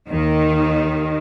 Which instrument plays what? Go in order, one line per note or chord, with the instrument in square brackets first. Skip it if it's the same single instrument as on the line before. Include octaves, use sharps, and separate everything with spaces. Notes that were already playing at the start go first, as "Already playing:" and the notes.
[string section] D#2 D#3